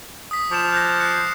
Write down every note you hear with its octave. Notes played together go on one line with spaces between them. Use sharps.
D#6 B6
F3 D6 E7
F#6 G6 A#6
F#6 C7 C#7